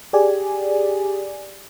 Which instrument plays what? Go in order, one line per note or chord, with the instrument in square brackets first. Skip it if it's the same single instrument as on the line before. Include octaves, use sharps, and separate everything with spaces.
[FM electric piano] G4 G#4 D5 G#5